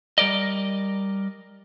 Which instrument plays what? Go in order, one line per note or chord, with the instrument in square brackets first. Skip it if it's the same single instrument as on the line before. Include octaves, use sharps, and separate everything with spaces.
[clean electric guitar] G3 A#4 D5 D#5